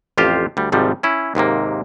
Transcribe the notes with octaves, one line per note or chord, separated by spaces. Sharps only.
A1 F2 F4 G4 C5 F5
D2 G3
G#1 G#2 C3 F3 G3
C#4 E4
D#2 G#2 C3 A#3